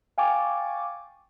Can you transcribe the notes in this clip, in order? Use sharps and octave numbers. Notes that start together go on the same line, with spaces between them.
F5 G5 G#5 C#6 D6 A6